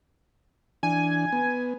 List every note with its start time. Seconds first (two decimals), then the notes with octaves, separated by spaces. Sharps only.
0.83 E3 D4 G#5
1.33 B3